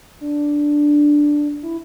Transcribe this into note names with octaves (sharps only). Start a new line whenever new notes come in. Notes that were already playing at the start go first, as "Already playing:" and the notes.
D4
E4